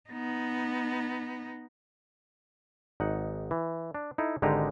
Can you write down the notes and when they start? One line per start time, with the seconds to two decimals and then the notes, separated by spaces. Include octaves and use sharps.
0.10 B3 D#4
3.00 G#1 D#4 F#5
3.51 E3
3.95 D4
4.18 D#4 E4 A4
4.42 G#1 D3 G#3 D#4 G4 A#5